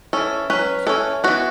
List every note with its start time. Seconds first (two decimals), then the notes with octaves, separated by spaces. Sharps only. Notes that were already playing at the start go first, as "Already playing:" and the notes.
0.13 E3 C#4 A4
0.50 F#3 C#4 B4
0.87 E3 C#4 A4
1.24 E3 B3 F#4